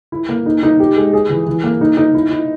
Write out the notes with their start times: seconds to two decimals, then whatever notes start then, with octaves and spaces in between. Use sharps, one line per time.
0.12 E4
0.29 A#3
0.46 D#4
0.63 D#4
0.80 G4
0.97 G#3
1.13 G#4
1.29 E3
1.47 E3
1.64 A#3
1.81 D#4
1.97 D#4
2.14 E4
2.31 E4